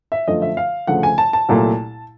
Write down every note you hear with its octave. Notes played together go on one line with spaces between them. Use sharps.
E5
F#2 D3 F3 A3 D#5
E5
F5
D2 C#3 F3 A3 F#5
G#5
A5
A5
C2 A#2 F#3 A3